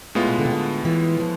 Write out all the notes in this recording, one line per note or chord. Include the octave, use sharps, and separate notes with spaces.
A2 G#3 B3 F4
B2
D3
C3
D3
E3
F3